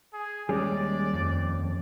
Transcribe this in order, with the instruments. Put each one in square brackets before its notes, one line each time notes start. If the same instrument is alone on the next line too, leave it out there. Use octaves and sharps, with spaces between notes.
[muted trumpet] G#4
[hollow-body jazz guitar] D#2 C#4 G#4 [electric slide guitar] G3 G#3 [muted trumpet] D5
[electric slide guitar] F2